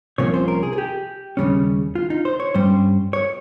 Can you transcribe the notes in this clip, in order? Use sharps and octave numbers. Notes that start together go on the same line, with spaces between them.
C2 C3 F3 A#3 C#4 C#5
C5
A#4
G#4
G#4
G4
D#2 C#3 G3 C#4
F4
D#4
C5
C#5
G2 G3 C#4 C5
C#5